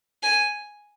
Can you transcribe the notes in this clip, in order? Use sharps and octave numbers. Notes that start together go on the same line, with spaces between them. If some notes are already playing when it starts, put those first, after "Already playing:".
G#5